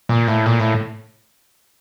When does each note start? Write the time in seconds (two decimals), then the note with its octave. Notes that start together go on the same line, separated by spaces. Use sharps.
0.09 A#2
0.27 A2
0.46 A#2
0.60 A2